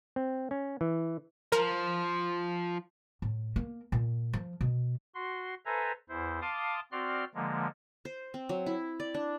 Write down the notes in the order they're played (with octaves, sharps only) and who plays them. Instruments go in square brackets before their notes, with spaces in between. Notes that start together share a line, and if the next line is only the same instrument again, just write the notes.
[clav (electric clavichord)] C4
C#4
E3
[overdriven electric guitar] F3 [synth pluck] A#4
[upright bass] A2
A#3
A#2
F3
B2
[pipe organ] F#4 C6
A4 B4 C5 E5 G#5 A#5
E2 E4 C5
F5 A5 C6 D6 D#6
C4 F#4 D5 C6 F6
D3 F3 G#3 A#3
[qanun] C5
C4
F#3
E4
D5
D4